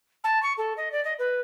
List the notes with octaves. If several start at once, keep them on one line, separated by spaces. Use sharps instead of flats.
A5
C#6
A4
D#5
D5
D#5
B4